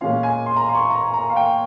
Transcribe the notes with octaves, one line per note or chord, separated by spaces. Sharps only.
A#2 G#3 C#4 F4 F5
G#5
C6
A#5
C6
C#6
C6
A#5
A#5
F5
G5